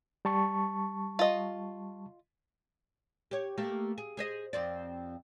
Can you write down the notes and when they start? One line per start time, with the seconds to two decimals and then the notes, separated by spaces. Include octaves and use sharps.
0.25 G3 A5 C#6
1.19 F4 D#5
3.31 G4 C#5
3.57 A3 A#3 G4
3.98 G#4
4.17 G#4 C5 D#5
4.53 F2 C4 D5